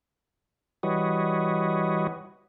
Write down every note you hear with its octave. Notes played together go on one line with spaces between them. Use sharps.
E3 G3 F#4 B4 C#5 D#5